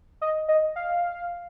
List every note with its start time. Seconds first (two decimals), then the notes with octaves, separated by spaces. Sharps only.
0.21 D#5
0.48 D#5
0.76 F5